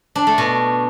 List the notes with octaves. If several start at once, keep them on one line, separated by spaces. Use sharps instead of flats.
D4
A3
B2